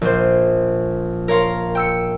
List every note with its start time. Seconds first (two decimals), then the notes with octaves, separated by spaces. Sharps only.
0.01 A#1 C5
1.28 A#4 C#5 F5 C6
1.75 G5 E6 C#7